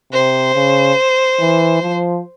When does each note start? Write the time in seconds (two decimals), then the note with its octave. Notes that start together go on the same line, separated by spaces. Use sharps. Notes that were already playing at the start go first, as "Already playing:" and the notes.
0.12 C3 C5
0.55 C#3
1.40 E3
1.82 F3